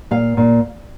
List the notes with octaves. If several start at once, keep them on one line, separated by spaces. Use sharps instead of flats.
A#2 F5
A#2